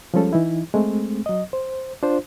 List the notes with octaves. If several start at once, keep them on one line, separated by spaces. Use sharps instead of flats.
F3 G3 G#3 C#4 A4
E3 D#4 E4
G#3 A3 C4
F#3 D#5
C5
D4 F4 C5